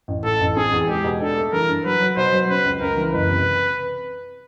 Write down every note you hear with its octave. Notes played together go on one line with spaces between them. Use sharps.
A1
A2 A4
A1
C4 G#4
E2
G#3 G4
B2
D4 A4
A3
E3 A#4
G2
F#3 B4
F#3
B2 C5
F#3
C#3 B4
C#2
C#2 A#4
E3
F#1 B4
C3